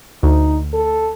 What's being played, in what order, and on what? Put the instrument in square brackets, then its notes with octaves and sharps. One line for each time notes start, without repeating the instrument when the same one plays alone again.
[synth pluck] D2 [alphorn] D#4
[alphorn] A4